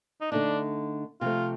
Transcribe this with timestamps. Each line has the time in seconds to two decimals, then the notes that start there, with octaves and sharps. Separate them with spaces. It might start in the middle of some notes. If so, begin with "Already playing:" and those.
0.21 D#4
0.31 D3 A3 D4 D#4
1.21 C3 F3 A3 F4